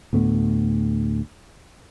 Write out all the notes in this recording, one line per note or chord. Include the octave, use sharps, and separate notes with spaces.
D2 A2 A3 B3